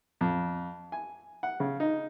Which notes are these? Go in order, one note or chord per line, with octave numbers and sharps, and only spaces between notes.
F2
G#5
F#5
C#3
D#4